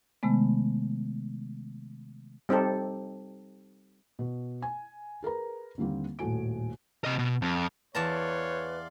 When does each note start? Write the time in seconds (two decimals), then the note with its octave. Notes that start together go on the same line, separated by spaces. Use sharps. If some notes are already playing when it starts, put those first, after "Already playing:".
0.23 C3 D#3 G#3 A3 B3
2.49 G3 C4 D#4 G4 A4
4.19 B2
4.62 G#5
5.22 G#4 A#4 B4 A#5
5.78 D#2 D3 G3 A#3 C4
6.19 D#1 A2 A3 F#4 G#5 D7
7.05 C3 D#5
7.19 B2
7.42 F2
7.95 E2 B4 C#5 D5 F5 A5 A#5 C6